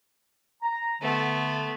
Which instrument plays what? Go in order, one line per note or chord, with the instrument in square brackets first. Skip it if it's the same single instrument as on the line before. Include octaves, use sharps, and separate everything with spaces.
[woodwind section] A#5
[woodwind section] D3 [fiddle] A3 B3